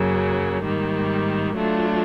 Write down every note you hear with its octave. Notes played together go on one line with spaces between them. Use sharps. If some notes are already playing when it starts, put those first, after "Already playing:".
Already playing: F#2 C#3 F#3 A#3
G#2 D#3 G3 A#3
F#3 A3 D4 F4